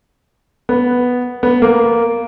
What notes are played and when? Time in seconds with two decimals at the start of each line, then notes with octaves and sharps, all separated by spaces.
0.69 B3
1.43 B3
1.62 A#3